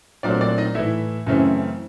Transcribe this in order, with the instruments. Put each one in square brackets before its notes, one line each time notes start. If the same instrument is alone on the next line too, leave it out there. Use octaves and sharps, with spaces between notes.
[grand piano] A#2 F#3 A3 C4 D4 D5
D4 D5
D#4 D#5
A2 E3 A3 E4 E5
F#2 C#3 E3 A3 C4